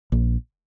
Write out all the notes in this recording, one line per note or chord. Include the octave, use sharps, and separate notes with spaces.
A#1